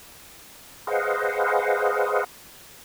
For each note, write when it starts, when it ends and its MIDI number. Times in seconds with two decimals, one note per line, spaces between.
0.87 2.24 68
0.87 2.24 71
0.87 2.24 72
0.87 2.24 75
0.87 2.24 77
0.87 2.24 78